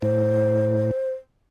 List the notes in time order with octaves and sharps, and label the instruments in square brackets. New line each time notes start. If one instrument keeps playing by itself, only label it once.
[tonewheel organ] A2 [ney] C5